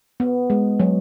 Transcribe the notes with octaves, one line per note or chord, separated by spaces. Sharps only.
B3
G#3
F#3